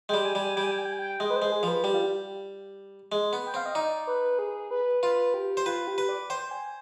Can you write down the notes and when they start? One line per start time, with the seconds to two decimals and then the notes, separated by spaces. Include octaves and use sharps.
0.09 G#3 G5
0.14 G3
0.25 G#5
0.35 G3
0.41 G#5
0.56 G3 G5
0.64 G#5
0.71 G5
0.78 G#5
0.85 G5
0.92 G#5
0.99 G5
1.20 G#3 D#5
1.30 B4
1.36 C5
1.42 G#3
1.52 G#4
1.63 F3
1.68 B4
1.84 G3 G4
1.94 F4
2.04 G4
3.12 G#3
3.33 B3
3.46 G5
3.54 C4 F5
3.66 D#5
3.75 D#4 D5
4.07 B4
4.39 G#4
4.71 B4
5.03 F4 B4
5.34 G4
5.57 C5
5.66 F4 B4
5.87 G4
5.98 B4
6.09 D5
6.30 C5 G5
6.51 G#5